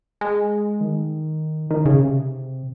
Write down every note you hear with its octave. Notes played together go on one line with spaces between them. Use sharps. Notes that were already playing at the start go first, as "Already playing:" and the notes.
G#3
D#3
D#3
C#3
C3